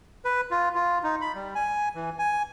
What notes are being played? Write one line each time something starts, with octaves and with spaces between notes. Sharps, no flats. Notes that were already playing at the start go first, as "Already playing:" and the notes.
B4
F4
F4
D#4
B5
G3
G#5
E3
G#5